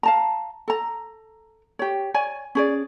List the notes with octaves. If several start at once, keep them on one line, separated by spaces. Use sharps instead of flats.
F5 A5 A#5
A4 A#5
G4 C#5
C#5 D5 G#5
C#4 G#4 D5